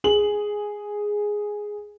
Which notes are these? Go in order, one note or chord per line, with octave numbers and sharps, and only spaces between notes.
G#4 F#7